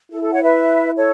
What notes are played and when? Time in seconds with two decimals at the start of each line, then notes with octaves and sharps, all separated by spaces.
0.11 E4 A4
0.22 A4
0.33 C#5 F#5
0.43 B4 E5
0.96 A4 C#5